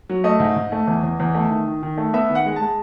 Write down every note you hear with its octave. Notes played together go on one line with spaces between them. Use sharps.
F#3
A3 D#5
G#2
G#2
A3
E2
E2
E2
A3
D#3
D#3
D#3
A3
B3 E5
D#3
F#5
G#3
G#3 A5